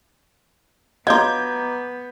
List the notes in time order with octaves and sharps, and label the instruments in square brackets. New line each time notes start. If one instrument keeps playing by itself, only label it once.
[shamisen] F#3 F4 [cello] B3 [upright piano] D#5 A#5 [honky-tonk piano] D6 G6 G#6